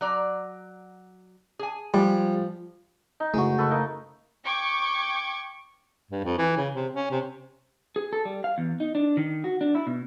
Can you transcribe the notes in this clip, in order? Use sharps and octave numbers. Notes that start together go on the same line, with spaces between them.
F#3 D5 A#5
G#4 G#5
F3 G3 G#3 G4
D#4
F#1 G#3 A3 E4 F#4
F#1 A4 B4 C#6
A#3 D#4
G5 C#6 D6 G#6
G2
F2
E3
C#3
C3
C#4
C3
G#4
A4
G3
F5
E2
D#4
D4
D#3
F#4
D4
E4
B2